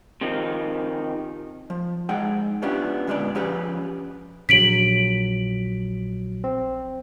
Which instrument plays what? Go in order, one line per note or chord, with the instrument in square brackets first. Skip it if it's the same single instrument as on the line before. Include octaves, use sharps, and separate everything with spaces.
[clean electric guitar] C3 D#3 F3
[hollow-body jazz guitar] F3
G#3 D#4 G#4 D#5 F#5 G5
B3 C#4 D4 E4 F4 G4
A#2 D3 G#3 B3 C5 D5
F3 C#4 G4 G#4 B4
[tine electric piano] A#1 F#3 [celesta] B6 D7 F#7
[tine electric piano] C4